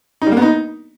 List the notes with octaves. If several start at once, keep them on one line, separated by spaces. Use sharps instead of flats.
D#4
G3
A#3
B3
D#4